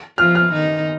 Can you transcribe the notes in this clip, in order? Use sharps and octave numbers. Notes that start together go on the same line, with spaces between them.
F3 F4 F6
F6
D#3 D#4